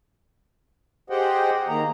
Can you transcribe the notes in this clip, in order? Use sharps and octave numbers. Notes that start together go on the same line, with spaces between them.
G4 G#4 C5 D#5 F#5 G5
D#3 A#3 A#5